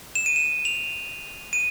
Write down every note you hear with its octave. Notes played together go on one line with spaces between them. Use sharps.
E7
D#7
E7
F7
D#7